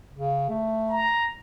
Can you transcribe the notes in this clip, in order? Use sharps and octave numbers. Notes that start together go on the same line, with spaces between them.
C#3
A3
A#5